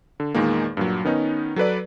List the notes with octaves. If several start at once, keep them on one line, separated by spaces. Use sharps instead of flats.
D3
E2 A#2 D#3 G#3 A#3
G2 A#2 F#3
D#3 B3 C#4 D#4
F#3 A4 B4 D5